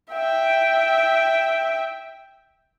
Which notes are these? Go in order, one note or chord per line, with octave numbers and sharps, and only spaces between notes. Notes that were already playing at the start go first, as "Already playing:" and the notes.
E5 G5